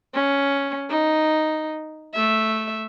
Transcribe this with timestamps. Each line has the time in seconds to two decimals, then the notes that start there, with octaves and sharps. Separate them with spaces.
0.14 C#4
0.90 D#4
2.13 A3 E5